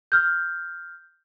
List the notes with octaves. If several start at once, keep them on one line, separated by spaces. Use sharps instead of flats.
F6 G6